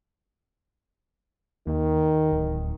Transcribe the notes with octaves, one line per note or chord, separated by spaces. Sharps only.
D#2 D#3
D1